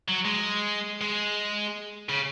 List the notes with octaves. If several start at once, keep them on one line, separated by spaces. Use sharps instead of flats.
F#3
G#3
G#3
C#3